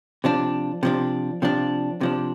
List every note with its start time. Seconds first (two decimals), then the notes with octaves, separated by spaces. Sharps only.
0.24 C3 F3 D4
0.83 C3 F3 D4
1.42 C3 F3 D4
2.01 C3 F3 D4